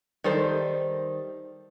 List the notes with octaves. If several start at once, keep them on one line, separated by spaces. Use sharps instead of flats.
D#3 G3 A4 C5